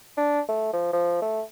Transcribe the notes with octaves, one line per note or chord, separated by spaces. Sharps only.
D4
A3
F3
F3
A3